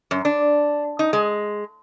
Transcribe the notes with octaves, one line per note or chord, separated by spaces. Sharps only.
F#2
D4
D#4
G#3